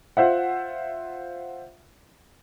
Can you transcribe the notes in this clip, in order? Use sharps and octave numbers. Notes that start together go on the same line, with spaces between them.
F4 C5 E5 F#5